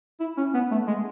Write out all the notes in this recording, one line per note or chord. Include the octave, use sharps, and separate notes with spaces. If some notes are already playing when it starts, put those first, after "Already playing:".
E4
C#4
B3
A3
G#3